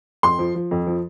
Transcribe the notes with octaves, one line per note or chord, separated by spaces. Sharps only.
F2 C6
F3
F3
F2
F3